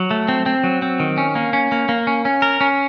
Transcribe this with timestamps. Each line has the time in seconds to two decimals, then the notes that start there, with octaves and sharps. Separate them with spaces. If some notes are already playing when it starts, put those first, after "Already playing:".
Already playing: F#3
0.11 A3
0.28 C4
0.46 C4
0.64 F#3
0.82 C4
1.00 D#3
1.18 C#4
1.35 A#3
1.53 C#4
1.72 A#3
1.89 A#3
2.07 C#4
2.25 C#4
2.42 A#4
2.61 C#4